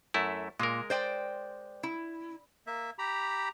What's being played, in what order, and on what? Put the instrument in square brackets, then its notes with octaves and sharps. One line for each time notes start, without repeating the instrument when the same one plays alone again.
[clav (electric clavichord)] F#2 A3 E4
[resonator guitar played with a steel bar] A#2 [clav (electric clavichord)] G#3 A#4
[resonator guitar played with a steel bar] C5 D5 G5
E4
[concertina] A#3 E5
G4 A#5 B5